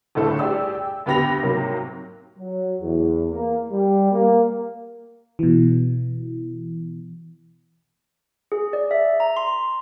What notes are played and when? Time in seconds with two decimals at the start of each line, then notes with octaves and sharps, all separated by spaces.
0.15 G1 D2 A2 A3 A4
0.39 G4 G#4 D5 E6
0.75 G5
1.06 D2 B3 G4 B5 A#6 F7
1.43 G#2 C3 F#3 A#3
2.38 F#3
2.80 E2
3.31 A#3
3.71 G3
4.11 A#3
5.39 B2 E3
8.52 G#4
8.73 D5
8.91 E5
9.20 A#5
9.37 C6